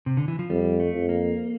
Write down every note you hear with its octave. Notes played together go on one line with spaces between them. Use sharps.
C3
D3
E3
F3
F2 G3
A3
F2
A#3